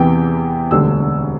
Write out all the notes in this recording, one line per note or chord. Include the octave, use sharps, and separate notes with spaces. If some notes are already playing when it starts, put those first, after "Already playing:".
Already playing: E2 C3 E3 G5
E1 D2 D3 G3 E6